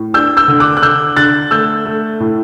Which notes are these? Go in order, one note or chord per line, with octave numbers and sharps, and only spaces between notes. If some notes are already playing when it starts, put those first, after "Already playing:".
Already playing: A2
D4 E6 G6
E6 G6
D3
D6 F#6
F#6
D3 E6 G6
D3 F#6 A6
A3 E6 G6
A3
A2